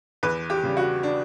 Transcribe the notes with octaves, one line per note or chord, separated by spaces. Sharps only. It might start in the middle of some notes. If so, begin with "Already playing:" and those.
E2 B4
G4
C#3 G3
F#4
D4